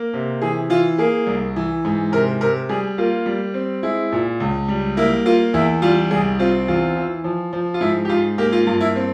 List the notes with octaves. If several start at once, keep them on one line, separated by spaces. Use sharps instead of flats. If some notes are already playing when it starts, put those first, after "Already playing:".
Already playing: A#3
C3
E3 G#4
E3 F4
A#3 G#4
C2
E3
G#2
C3 A#4
C3 A#4
G3 G#4
A#3 F4
G3
C4
G#3 E4
A#2
C#2
G3
A#3 E4
A#3 F4
E2 E4
G3 F4
C2 G#4
C4 F4
E2 F4
E3
F3
F3
F4
G#2 E4
G4
G#2 F4
A#3 G4
F4
G2 F4
E4
C4